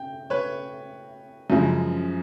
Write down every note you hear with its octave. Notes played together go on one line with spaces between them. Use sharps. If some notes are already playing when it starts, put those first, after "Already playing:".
Already playing: G5
B4 C#5
F#2 C#3 F3 G#3